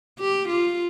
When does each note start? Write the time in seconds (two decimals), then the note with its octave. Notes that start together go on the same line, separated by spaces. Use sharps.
0.19 G4
0.49 F4